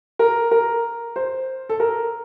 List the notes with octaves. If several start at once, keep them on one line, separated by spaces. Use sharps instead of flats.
A#4
A#4
C5
A4
A#4